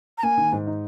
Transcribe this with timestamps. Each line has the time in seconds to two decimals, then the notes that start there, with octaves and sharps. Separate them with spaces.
0.18 A#5
0.23 A#3 G#5
0.37 D#3
0.52 G#2
0.67 D#4